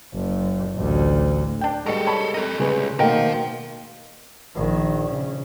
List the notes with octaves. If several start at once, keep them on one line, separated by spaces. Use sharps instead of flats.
F#1
A1 D2
D4 G5
B2 G3 G#3 A4 A#4
C#5 A5 B5
A4 A#4 D#5
C#2 G3 G#4 B4
B2 D#3 A#3 A#4 C5 F5 G5
A#1 D#3
C#3